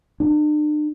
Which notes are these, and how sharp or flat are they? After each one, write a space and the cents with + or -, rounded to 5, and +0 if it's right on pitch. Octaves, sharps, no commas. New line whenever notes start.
D4 +45